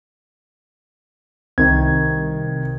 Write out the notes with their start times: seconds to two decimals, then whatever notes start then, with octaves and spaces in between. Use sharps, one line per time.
1.58 C2 C3 D#3 G#6